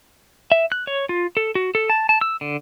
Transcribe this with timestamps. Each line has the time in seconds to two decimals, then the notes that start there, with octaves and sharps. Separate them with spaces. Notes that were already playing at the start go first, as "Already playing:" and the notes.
0.52 E5
0.72 F#6
0.87 C#5
1.09 F4
1.37 A4
1.55 F#4
1.75 A4
1.90 A5
2.09 A5
2.21 E6
2.41 D3